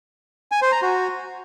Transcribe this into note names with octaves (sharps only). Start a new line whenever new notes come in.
G#5
C5
A#5
F#4